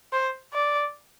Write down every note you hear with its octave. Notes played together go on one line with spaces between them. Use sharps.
C5
D5